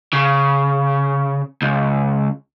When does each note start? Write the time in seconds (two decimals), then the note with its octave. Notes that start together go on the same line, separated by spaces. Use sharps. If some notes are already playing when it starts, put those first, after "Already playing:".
0.13 C#3
1.62 C#2